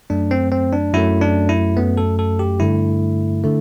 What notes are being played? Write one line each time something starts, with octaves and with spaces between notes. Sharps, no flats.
F#2 F#3 A3 D4
C4
C4
D4
F#2 F#3 A3 E4
D4
E4
F#2 F#3 A3 B3
A4
A4
G4
G2 D3 A3 E4
D3 A3